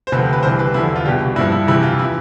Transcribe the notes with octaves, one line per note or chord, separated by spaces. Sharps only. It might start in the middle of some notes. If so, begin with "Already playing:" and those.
C5
D2 C3 F3 B4
B4
C2 C3 E3 C5
B4
E2 D3 F3 E4
F4
C2 B2 G4
G2 F3 E4
E4
F2 C3 E3 E4
F4
E4
E3